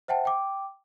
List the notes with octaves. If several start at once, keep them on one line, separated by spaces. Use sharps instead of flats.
C5 E5 F#5 G5 A5
G5 D6